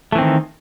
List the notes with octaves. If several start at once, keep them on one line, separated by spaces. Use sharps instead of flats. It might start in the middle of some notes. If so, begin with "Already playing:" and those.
D#3 E3 A3 C4